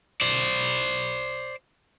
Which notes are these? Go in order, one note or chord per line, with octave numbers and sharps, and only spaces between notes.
C5 D5